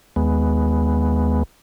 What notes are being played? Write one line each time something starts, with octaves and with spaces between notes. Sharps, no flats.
D#2 G#3 B3